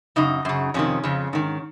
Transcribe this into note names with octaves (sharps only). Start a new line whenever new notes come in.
F#2 C#3 D#4
F#2 C#3
F2 C3 D#3 C#4
F2 C#3
G#2 D#3